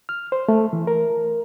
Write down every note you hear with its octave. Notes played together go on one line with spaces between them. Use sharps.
F6
C5
A3
E3
A#4